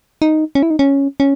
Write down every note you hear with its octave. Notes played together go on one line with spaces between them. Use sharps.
D#4
C#4
E4
D#4
C#4
C#4